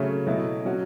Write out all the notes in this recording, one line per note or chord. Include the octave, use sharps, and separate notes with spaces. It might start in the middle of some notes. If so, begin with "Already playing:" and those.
Already playing: C#3 F#3 A3 C#4
B2 F#3 A3 E4
F#3 C#4 F#4